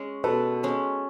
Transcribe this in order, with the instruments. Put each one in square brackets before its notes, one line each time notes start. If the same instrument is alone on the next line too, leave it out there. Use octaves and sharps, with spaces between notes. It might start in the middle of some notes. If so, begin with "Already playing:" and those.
Already playing: [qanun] G#3 C#4
[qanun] B2 [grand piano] A4 B4
[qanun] G#3 C#4